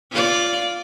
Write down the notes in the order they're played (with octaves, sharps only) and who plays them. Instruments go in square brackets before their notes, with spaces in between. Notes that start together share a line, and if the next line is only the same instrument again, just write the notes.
[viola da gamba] F4 D5